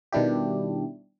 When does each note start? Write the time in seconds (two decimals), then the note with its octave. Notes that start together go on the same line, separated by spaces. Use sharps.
0.13 B2 D#3 G3 D4 E4 G4